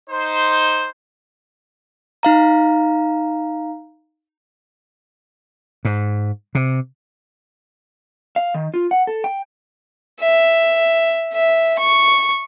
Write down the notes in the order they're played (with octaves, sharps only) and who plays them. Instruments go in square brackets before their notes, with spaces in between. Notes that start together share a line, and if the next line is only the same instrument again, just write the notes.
[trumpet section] D#4 C5
[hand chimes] D#4 F5 A#5
[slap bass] G#2
C3
[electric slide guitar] F5
D#3
F4
F#5
A4
G5
[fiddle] E5
E5
C#6